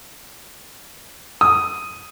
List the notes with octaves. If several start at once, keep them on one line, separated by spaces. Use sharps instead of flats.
D#6